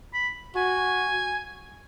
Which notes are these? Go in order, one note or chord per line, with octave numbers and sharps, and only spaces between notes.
B5
F#4 G#5